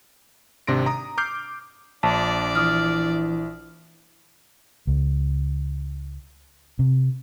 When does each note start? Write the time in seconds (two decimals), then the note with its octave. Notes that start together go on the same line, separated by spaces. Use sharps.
0.67 G#1 C3 D4 C6 A#6 D7
0.86 A#5 D#6
1.18 D6 F6 G6 C7
2.03 A#1 D4 D5 A5
2.55 E3 D#6 F6
4.87 C#2
6.79 C3